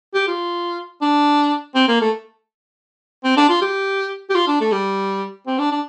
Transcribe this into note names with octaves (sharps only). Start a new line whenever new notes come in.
G4
F4
D4
C4
A#3
A3
C4
D4
F4
G4
G4
F4
D4
A3
G3
C4
D4
D4